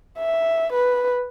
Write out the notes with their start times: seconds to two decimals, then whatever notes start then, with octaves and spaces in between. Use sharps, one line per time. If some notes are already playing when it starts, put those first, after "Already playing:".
0.18 E5
0.73 B4